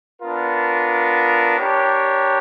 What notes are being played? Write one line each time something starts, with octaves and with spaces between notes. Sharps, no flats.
B3 D4 F4 A#4
D4 G4 A#4 C#5